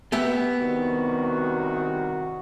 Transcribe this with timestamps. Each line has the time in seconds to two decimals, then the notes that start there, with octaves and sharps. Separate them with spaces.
0.12 B3 G4 E5
0.60 C2 D#3 F#4